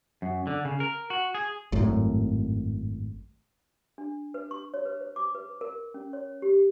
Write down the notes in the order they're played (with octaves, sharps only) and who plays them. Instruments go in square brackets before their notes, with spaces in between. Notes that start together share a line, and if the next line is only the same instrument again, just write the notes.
[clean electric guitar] F#2
D3
C#3
A#4
F#4
G#4
[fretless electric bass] G#1 F#2 A2
[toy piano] D4
B4
C#6
C#5
B4
C5
D6
B4
A#4
C#4
C#5
G4